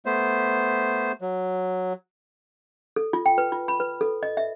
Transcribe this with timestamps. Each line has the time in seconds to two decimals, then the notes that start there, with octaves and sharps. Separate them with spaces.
0.06 A3 B3 C5
1.21 F#3
2.96 A4
3.13 F4
3.26 G5
3.38 B4
3.52 F4
3.68 B5
3.80 B4
4.01 A4
4.23 D#5
4.37 E5